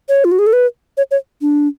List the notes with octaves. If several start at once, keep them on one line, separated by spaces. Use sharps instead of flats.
C#5
F4
F#4
G#4
A4
B4
C#5
C#5
D4